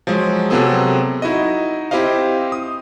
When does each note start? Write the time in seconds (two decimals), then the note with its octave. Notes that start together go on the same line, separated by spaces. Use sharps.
0.07 F3 F#3 G#3
0.50 C3 F#3 B3 C4 G#4 A4
1.22 D#4 E4 F#4 D#5
1.91 C4 E4 G4 C5 D#5 F5
2.52 D#6